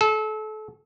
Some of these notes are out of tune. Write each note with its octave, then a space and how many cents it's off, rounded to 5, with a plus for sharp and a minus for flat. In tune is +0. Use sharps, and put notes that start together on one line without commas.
A4 -30